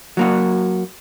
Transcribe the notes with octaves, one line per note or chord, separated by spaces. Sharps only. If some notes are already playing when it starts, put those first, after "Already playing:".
F#3 A#3 F#4